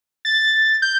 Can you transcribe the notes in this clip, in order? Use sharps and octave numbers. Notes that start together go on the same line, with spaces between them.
A6
G6